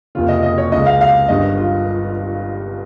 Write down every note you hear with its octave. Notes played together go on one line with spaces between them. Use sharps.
F1 D#2 C#3 F4
D#5
D#5
C#5
C#2 C#3 G#3 D#5
F5
F5
G1 G2 D#3 D#5
F4